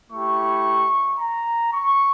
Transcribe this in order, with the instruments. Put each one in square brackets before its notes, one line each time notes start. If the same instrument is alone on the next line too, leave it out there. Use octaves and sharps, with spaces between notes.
[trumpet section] A3 E4 G4 C#6
A#5
C#6